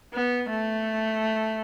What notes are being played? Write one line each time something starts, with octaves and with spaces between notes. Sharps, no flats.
B3
A3